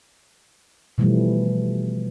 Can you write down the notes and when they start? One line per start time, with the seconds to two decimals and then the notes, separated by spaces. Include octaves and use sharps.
0.98 B2 E3 F3 G3 A3